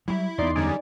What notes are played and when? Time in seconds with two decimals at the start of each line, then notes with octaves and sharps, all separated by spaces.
0.08 F#3 G3 E4
0.38 E2 B3 D#4 D5 C6
0.55 F#2 D3 G3 D#4 D5 G#5